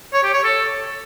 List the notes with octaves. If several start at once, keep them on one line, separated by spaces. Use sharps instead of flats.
C#5
G4
C#5
A4